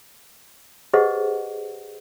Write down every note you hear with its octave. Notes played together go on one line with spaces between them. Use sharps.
G4 G#4 B4 C5 D#5 F#5